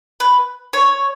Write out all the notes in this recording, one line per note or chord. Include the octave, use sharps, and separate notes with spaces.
B4
C#5